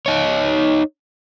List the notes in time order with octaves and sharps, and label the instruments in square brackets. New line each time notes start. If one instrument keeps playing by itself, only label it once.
[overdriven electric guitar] D#4 C#5